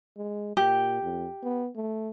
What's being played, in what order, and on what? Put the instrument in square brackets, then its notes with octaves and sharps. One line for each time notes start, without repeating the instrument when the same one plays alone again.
[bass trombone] G#3
[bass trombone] A#2 [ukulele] G4
[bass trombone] F2
B3
A3